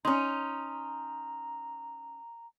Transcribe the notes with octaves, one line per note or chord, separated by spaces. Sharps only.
C#4 D#4 A#5 C6